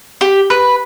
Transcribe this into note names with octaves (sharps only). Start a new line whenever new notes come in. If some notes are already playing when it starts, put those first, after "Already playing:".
G4
B4